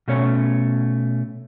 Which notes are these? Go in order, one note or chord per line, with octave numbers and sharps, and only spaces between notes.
B2 A3 C#4 C#5